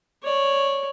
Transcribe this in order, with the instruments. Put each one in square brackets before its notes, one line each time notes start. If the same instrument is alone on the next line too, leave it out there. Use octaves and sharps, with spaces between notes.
[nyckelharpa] C#5 D5